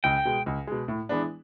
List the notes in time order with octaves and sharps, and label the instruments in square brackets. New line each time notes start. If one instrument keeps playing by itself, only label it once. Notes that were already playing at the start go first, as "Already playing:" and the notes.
[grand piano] C#2 [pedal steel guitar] G5
[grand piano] B2 G#3
C#2
B2 G#3
A2
E3 G#3 B3 D4